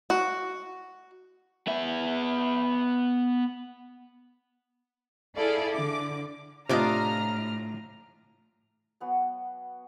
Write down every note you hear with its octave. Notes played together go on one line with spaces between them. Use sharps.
F#4
B3 E5
E4 G#4 A4 D5 F5
D3 D6
A2 C3 D4 F4 D#5 A#5 D6 F6
F#3 B3 G#5